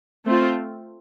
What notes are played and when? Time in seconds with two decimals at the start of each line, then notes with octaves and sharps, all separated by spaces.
0.25 A3 C4 F4